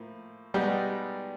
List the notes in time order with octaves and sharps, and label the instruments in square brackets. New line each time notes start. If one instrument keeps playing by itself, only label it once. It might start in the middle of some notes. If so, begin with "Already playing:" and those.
Already playing: [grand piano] A2 F3 A#3
[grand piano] B2 G#3 B3 D#4 F#4 [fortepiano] G3